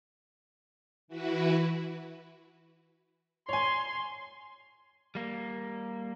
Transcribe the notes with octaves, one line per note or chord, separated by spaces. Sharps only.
E3 E4 F#4 B4
C#5 G#5 C6
G3 A#3